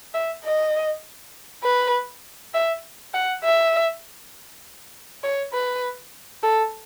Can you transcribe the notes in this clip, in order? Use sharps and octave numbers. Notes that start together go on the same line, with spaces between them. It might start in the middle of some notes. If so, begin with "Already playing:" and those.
E5
D#5
B4
E5
F#5
E5
C#5
B4
A4